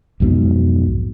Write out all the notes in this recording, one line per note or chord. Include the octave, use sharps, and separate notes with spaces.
B1 F2 G#2 B2